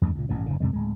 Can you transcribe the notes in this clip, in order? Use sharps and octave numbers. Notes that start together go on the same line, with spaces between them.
E2 G2 G3 A3
C#2 A#2
A1 G2 B2
F#1 G#2 C#3
F#2 C3 G3 G#3
D1 G#3